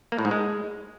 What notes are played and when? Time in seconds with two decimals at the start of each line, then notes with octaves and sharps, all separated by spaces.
0.12 A#3
0.18 A2
0.25 G#2
0.31 G#3